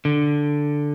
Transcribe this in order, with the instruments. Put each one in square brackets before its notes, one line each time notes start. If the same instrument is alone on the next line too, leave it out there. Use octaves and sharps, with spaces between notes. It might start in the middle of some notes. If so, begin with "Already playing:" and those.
[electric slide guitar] D3